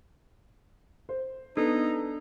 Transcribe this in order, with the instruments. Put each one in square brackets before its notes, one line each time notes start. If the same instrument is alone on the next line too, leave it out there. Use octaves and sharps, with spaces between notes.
[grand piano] C5
[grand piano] B3 [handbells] D4 A4 [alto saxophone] D#4